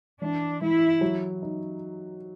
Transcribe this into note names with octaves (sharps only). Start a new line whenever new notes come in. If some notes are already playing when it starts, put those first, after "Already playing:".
E3 D4
E3 E4
F#3
D#4